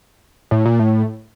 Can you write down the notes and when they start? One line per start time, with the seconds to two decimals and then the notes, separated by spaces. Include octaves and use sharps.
0.51 A2
0.66 A#2
0.79 A2